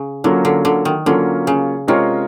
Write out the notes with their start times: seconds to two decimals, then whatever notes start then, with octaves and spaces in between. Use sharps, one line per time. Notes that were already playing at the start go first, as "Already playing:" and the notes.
Already playing: C#3
0.24 D3 F#3 A#3 C#4 F4
0.45 D3
0.65 D3
0.85 D#3
1.06 D3 F#3 A#3 C#4 F4
1.47 C#3
1.88 C3 G#3 C#4 F4 A#4 C#5